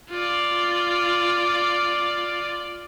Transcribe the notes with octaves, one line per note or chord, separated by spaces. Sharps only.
F4 D5